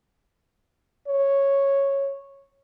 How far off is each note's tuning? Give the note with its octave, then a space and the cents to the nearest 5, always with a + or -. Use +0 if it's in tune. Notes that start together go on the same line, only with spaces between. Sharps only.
C#5 -5